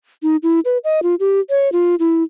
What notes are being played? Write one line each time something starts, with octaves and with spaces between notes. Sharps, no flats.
D#4
E4
B4
D#5
F4
G4
C#5
F4
E4